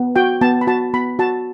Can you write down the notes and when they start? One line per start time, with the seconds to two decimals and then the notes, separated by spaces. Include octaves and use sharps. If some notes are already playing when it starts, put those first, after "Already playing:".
Already playing: B3
0.16 F#4 G5
0.41 B3 A5
0.61 B5
0.67 F#4 A5
0.94 B3 B5
1.19 F#4 A5